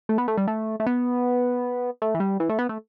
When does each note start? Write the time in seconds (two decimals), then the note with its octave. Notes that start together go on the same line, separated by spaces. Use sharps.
0.09 A3
0.18 B3
0.28 A3
0.38 G3
0.47 A3
0.80 A3
0.86 B3
2.02 A3
2.14 E3
2.20 G3
2.40 E3
2.49 A3
2.59 B3
2.69 A3